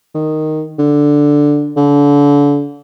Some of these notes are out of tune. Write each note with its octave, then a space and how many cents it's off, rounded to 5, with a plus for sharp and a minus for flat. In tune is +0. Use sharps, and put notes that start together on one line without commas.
D#3 -5
D3 +0
D3 -35